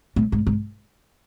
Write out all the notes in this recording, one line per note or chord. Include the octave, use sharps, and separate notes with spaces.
A2
G#2
G#2